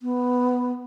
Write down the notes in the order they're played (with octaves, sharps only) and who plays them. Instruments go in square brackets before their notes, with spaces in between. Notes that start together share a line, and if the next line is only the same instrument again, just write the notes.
[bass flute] B3